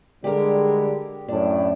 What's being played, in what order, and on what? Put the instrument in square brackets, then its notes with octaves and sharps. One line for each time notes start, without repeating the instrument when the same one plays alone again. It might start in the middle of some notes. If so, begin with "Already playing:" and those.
[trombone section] D3 G3 G#3 [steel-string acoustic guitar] G4 A#4
[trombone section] F#2 A2 [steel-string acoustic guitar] D4